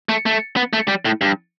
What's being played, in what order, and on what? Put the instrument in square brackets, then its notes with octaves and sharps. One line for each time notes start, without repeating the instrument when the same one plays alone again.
[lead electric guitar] A3
A3
B3
A3
G3
A2
G2